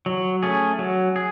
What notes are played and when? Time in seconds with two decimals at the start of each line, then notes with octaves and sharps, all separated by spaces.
0.06 F#3
0.43 A3 C#4 G#4
0.79 F#3
1.16 G#4